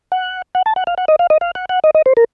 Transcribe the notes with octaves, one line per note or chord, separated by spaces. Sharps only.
F#5
F#5
A5
F#5
F5
F#5
D#5
F5
D#5
F5
F#5
F#5
D#5
D#5
C5
A#4